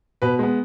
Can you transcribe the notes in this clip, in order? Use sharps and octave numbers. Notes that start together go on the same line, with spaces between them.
B2 B4
G#3 B3